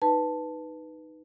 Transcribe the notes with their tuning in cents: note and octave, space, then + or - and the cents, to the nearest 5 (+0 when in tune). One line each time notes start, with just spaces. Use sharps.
D#4 +0 B4 +0 A5 +0